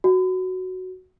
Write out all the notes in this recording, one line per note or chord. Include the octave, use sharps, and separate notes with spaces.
F#4